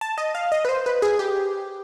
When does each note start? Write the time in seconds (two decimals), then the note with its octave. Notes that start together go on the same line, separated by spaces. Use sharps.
0.01 A5
0.18 D#5
0.35 F5
0.52 D#5
0.65 B4
0.69 C5
0.86 B4
1.02 G#4
1.19 G4